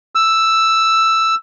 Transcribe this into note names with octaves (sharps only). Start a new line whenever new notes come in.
E6